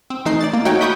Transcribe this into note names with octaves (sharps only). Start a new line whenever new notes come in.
C4
E3 A3 D#4 C7
D5 A6
A#3
A3 D#4 F#4 C#5 G5
B5 C#6 D#6 F#6 G6 B6